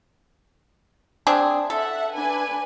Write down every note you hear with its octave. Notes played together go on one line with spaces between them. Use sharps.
C4 D4 G#4
A4 E5 F#5
D4 B4 G#5